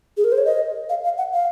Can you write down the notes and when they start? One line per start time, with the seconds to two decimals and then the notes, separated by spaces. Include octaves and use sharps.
0.17 G#4
0.24 A#4
0.32 C5
0.38 C#5
0.45 D#5
0.89 F5
1.04 F5
1.18 F#5
1.33 F5